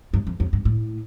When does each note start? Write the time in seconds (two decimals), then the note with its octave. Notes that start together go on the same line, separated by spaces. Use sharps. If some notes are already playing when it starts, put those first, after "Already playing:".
0.14 G2
0.27 F2
0.40 F2
0.53 G2
0.65 A2